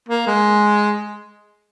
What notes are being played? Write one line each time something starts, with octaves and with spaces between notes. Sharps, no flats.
A#3
G#3